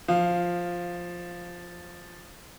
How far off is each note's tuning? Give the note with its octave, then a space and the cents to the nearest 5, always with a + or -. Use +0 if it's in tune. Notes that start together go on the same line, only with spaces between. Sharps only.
F3 +5 F5 +0